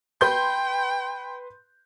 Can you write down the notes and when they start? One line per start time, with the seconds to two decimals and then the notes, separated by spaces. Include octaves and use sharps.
0.21 B4 G5 C6 G6